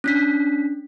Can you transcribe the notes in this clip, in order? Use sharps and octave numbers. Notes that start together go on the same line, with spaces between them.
C#4 D4 B6